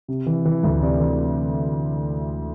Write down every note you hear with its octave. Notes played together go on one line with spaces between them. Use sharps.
C3
E3
E3
D2
C3 D5
E3